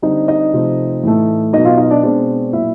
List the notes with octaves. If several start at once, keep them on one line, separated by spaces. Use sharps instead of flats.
D3 G3 C4 D#4 D#5
D#4 D#5
C3 F3 A3 C4
A2 E3 A3
B2 F#3 B3 D#4 D#5
F4 F5
D#4 D#5
D4 D5
B2 G#3 C4 D4 D5
A#2 F#3 A#3 E4 E5